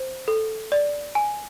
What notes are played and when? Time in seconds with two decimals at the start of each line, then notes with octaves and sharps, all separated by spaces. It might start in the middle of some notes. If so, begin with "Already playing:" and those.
Already playing: C5
0.28 A4
0.72 D5
1.15 G#5